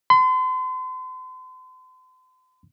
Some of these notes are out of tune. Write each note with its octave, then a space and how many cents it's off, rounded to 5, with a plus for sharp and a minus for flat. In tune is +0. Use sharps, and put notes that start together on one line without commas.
C6 -40